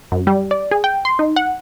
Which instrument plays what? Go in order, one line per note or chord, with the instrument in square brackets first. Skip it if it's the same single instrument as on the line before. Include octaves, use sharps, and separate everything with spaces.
[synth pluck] F#2
G3
D5
G#4
G5
C6
D#4
F#5